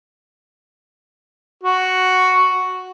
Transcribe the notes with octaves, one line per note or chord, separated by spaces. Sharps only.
F#4